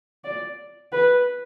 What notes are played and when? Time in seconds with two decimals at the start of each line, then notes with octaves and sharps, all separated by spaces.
0.24 D5
0.92 B4